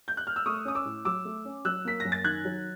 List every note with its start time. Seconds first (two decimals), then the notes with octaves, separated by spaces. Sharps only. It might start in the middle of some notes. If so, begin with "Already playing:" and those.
0.08 G6
0.17 F#6
0.27 F6
0.36 E6
0.46 A3 C#6 D#6
0.65 C#4 D#6
0.75 D6 E6
0.85 A2
1.05 F#3 D6 E6
1.25 A3
1.45 C#4
1.65 F#3 E6 F#6
1.85 A#3 B6
2.00 F#2 A#6
2.12 A6
2.24 D#3 F#6 G#6
2.45 F#3